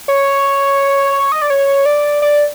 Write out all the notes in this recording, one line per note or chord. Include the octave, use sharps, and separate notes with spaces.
C#5
D#5
D5
C#5
D5
D5